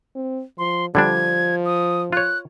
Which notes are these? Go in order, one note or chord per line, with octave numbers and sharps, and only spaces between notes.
C4
F3 C6
D3 F3 G3 D4 G#6
D#6
F4 C#5 F#6